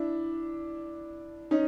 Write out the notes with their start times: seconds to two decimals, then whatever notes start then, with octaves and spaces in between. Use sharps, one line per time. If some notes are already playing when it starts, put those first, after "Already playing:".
Already playing: D4 E4
1.51 C#4 D#4